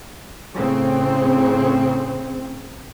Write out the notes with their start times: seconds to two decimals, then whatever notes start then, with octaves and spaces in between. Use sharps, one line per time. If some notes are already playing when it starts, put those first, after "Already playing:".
0.53 A2 C#3 C4